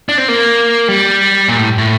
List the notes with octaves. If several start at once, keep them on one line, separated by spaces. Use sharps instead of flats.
D4
C4
A#3
G3
A#2
A2
A2